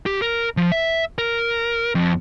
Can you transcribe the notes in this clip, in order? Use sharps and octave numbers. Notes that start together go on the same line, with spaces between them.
G4
A#4
F3
E5
A#4
F2